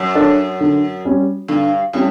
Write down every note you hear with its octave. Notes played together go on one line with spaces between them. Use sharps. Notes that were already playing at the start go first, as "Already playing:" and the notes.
Already playing: F#2
D4 A4 C#5
D3
G3 C#4
G2 D3
A2 G3 C#4